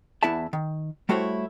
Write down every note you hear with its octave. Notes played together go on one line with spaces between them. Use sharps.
E2 B3 E4 D5 E5 A5
D#3
G3 A3 E4 F#4 C5 C#5